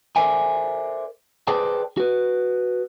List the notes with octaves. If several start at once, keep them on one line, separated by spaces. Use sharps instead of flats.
A4 A#4 C5 D5 E5 G#5
G#4 B4 C5 D5 G5 A5
F#4 B4